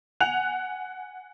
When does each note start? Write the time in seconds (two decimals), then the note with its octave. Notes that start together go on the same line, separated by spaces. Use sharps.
0.20 F#5 G#5 F#6 F7